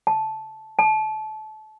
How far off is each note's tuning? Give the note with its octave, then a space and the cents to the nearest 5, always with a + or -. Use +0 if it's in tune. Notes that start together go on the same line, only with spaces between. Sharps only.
A5 -10
A5 -25